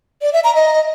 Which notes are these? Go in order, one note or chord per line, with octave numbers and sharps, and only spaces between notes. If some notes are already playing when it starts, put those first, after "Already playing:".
D5
E5
A#5
D#5